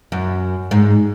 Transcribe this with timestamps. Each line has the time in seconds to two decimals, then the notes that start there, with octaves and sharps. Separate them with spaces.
0.12 F#2
0.71 G#2